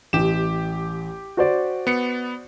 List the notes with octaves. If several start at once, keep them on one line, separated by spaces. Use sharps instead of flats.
A1 G4 E7
F#4 C5 D5
B3 C#7